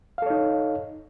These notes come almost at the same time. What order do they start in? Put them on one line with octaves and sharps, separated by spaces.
F5 A4 C#5 D#4